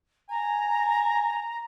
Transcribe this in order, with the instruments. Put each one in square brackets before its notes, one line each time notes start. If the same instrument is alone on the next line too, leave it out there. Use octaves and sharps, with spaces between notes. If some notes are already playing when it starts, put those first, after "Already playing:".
[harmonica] G#5 [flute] A#5